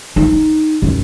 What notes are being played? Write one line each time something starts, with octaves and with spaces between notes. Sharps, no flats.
D#4
F#2